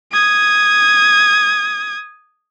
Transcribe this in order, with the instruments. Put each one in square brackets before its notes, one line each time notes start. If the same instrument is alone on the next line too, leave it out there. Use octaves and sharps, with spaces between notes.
[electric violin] D#6 G#6